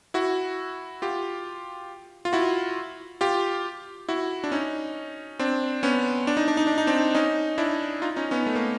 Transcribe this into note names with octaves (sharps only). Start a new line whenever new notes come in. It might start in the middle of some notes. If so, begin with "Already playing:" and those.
E4 F#4
F4 G4
F4
E4 F#4
F4 G4
E4 F#4
D4
C#4 D#4
C4 D4
B3 C#4
D4
D#4
D4
D#4
D4
D#4
C4 D4
C#4 D#4
D4 E4
D#4 F4
C#4 D#4
B3 C#4
A3
A#3